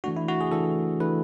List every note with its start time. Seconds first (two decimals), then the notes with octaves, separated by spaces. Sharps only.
0.04 E3 A3 D4 F#4
0.16 E4
0.28 F#4
0.41 G#4
0.52 E3 A3 D4 A4
1.00 E3 A3 D4 B4